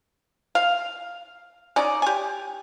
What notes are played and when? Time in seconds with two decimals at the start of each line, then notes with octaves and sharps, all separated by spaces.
0.55 F5
1.76 C#4 D#4 D5
2.02 G4 G#5